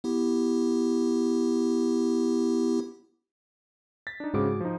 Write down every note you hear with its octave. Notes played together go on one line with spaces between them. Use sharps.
B3 E4 G4
A6 B6
D4 D#4
G#2 C#3 G#3 C4 F#4 D6
G#4
F3 D#4